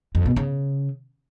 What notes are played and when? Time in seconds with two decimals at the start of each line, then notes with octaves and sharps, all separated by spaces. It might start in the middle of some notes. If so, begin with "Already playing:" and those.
0.15 F2
0.26 B2
0.36 C#3